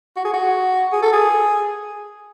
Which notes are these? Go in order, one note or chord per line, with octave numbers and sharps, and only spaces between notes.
F#4
G#4
F#4
G#4
A4
G#4